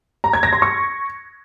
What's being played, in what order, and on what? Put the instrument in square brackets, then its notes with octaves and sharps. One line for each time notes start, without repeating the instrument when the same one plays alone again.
[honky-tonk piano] A#5
G#6
A#6
C6
C#6